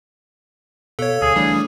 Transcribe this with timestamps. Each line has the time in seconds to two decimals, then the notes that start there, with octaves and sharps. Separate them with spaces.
0.99 B2 A4 C#5 F5
1.22 D2 G#4
1.36 E3 G3 A3 D4